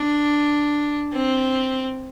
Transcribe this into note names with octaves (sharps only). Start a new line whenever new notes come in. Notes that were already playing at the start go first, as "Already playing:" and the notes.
Already playing: D4
C4